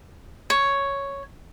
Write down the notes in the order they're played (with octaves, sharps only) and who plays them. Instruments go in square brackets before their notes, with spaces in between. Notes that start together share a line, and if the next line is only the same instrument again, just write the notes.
[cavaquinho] C#5